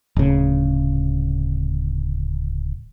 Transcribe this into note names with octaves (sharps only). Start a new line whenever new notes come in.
D1 C#3